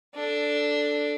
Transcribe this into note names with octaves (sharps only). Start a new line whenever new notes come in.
D4 A4